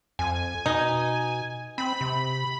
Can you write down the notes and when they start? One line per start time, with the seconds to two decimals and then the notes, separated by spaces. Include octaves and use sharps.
0.19 F2 G#5
0.66 B2 D#4
1.78 C4 B5
2.01 C3